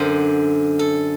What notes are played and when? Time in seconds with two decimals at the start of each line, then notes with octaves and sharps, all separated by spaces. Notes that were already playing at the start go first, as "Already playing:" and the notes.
Already playing: F#2 D3 C5
0.79 A4